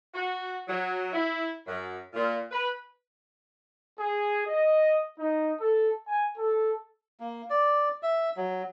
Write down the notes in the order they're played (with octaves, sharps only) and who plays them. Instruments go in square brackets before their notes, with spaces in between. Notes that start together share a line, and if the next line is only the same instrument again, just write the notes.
[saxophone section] F#4
F#3
E4
F#2
A#2
B4
[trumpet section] G#4
D#5
D#4
A4
G#5
A4
[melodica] A#3
D5
E5
F#3